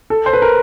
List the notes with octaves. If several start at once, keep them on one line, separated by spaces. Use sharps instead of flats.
A4
C5
B4
A#4